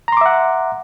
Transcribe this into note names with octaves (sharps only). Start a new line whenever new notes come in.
E5 F#5 A#5 C6 D6